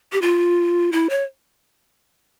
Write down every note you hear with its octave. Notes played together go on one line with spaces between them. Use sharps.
G4
F4
E4
C#5